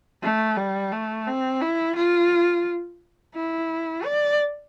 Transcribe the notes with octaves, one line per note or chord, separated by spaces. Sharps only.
A3
G3
A3
C4
E4
F4
E4
D5